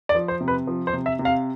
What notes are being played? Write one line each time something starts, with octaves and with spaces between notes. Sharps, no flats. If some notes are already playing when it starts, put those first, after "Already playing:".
D5
F3
C5
C3
B4
F3
C5
C3
E5
C3
F5